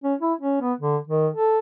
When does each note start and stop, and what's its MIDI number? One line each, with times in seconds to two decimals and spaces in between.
0.04 0.15 61
0.21 0.34 64
0.41 0.60 61
0.61 0.73 59
0.81 0.97 50
1.07 1.28 51
1.33 1.59 69